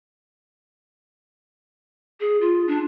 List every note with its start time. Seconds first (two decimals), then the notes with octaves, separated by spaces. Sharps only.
2.20 G#4
2.41 F4
2.68 D4